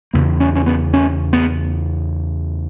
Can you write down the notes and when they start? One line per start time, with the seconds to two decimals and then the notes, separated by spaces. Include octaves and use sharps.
0.13 E2 C#3 A#3
0.40 C#4
0.56 C#4
0.66 B3
0.93 C#4
1.33 B3